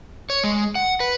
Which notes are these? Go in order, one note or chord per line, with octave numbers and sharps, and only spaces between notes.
C#5
G#3
F#5
B4